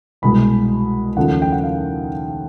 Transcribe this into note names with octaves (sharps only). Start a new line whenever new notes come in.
C2 B2 G#3 B5
D#2 C#3 F3 A3 F#5
G5
F#5
F5